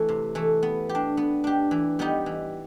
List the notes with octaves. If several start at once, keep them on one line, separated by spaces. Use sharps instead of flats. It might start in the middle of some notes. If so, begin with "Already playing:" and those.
Already playing: E3 A3
C3
E3 A3
B3
G4
D4
B3
D4 G4
E3
G3 B3 D#4 G4
E3